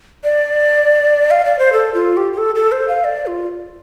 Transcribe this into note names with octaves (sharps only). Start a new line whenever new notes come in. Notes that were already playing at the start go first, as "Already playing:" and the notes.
D5
F5
D5
C5
A4
F4
G4
G4
A4
A4
C5
F5
D5
F4